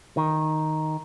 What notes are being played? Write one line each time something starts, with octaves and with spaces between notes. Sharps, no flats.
D#3